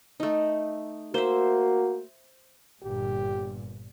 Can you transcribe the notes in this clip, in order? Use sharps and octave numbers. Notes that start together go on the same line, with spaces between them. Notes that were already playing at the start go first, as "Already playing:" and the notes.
A3 D#4
A#3 F#4 C5 E5
G1 A#2 G4